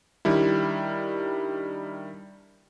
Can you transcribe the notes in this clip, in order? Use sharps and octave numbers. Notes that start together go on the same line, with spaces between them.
D#3 G3 D4 E4